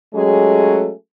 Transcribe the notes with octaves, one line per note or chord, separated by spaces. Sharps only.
F#3 G#3 A3 C#4 G4 G#4